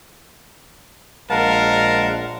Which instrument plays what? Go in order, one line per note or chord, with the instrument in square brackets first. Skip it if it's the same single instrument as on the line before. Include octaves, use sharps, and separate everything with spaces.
[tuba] A#1 [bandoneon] G#3 F5 F#5 [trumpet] A#4 [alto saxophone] A5